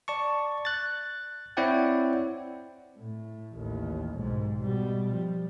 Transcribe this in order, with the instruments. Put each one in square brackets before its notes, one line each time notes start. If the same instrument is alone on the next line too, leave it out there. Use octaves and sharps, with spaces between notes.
[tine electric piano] D5 A5 C#6
F#6 A6
C4 E4 C#5 D5 F#5 G5
[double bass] A2
A1 D#2
B1 G#2
B2 G3
F3 G3